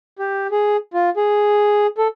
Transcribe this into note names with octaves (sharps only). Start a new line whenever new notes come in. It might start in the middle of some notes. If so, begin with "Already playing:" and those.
G4
G#4
F4
G#4
A4